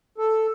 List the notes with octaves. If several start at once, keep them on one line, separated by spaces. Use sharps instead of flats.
A4